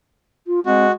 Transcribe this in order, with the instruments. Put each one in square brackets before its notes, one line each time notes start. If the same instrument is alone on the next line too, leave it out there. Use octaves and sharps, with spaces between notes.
[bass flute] F4
[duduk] G#3 [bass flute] C4 [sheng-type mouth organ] F#4